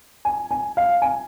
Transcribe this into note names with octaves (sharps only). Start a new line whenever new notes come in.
G#5
G#5
F5
G#5